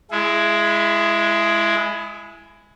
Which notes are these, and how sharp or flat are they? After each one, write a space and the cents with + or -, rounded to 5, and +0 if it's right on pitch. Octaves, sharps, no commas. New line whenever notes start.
G#3 +0 E4 +20 G#4 +45